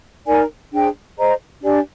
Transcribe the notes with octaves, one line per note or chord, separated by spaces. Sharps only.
D#4 A#4 D5 G#5
D4 G#4 C5 G5
G#4 C5 D#5 A#5
D4 G4 D5 G#5